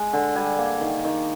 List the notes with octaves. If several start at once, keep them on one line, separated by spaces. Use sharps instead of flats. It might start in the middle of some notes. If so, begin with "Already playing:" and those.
Already playing: G#3
D3
G3 G#5
A#3
D#3
D#3